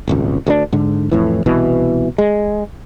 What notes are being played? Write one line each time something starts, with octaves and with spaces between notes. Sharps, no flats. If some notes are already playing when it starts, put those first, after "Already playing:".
D#1 G#1 C#2
D2 G3 D4
G#2 D3
F2 A2 E3
C2 B2 E3
G#3